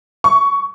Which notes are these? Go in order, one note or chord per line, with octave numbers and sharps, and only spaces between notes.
C#6